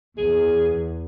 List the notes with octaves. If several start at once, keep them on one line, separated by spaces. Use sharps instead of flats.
E2 G#4